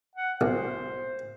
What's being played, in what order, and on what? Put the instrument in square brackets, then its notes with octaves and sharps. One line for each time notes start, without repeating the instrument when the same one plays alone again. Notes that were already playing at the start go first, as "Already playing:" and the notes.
[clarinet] F#5
[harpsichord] B1 [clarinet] C5